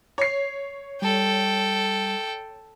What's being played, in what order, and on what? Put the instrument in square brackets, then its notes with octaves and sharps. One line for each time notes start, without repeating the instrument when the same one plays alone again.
[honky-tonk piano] C#5 C7
[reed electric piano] G3 [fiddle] A4 G5